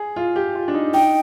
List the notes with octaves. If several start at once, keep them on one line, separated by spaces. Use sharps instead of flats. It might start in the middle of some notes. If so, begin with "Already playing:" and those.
Already playing: G#4
F4
G4
F4
D4
D#4
D#4 G5